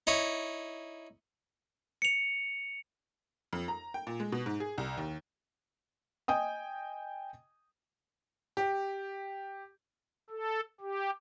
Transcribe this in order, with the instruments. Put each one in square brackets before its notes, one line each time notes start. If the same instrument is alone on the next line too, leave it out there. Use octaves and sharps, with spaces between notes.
[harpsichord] D#4 E4 C#5
[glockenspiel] C#7 F7
[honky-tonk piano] F2
A#5
G5
A#2
G#3
B2
G#2
G#4
C2
D#2
[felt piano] D#5 G5 G#5 D#6
[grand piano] G4
[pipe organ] A4
G4